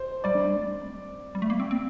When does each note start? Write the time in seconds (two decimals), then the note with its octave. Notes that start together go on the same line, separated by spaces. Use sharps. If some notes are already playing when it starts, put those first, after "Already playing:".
Already playing: C5
0.24 G3 D5
0.35 D4
0.45 G3
0.56 A3
0.66 C4
1.35 G3
1.42 A3
1.50 A#3
1.60 C4
1.71 C4